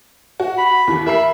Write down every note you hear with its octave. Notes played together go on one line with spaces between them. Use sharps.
F#4
B5
D#2 E3
A#4 E5 B5 C7